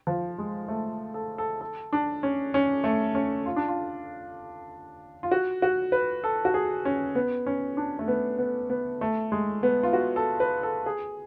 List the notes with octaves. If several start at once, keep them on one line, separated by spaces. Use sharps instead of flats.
F3
G#3
A3
A4
A4
A4
D4
C#4
C#4
A3
C#4
F4
D4
F4
F4
F#4
F#4
B4
A4
F#4
G#4
C#4
B3
C#4
D4
A3
B3
B3
B3
A3
G#3
B3
F4
F#4
A4
B4
A4
G#4